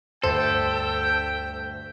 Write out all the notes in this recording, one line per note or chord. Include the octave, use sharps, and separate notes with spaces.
D2 G2 A4 C5 G5 B6